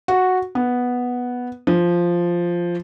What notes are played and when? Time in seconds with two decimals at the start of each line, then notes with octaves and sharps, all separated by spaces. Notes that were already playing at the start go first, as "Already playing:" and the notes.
0.08 F#4
0.55 B3
1.67 F3